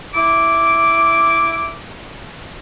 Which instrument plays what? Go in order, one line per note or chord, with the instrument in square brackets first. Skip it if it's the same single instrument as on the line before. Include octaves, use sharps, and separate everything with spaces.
[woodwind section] E4 D6